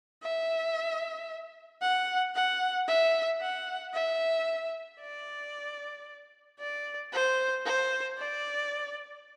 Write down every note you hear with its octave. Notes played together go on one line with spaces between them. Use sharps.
E5
F#5
F#5
E5
F#5
E5
D5
D5
C5
C5
D5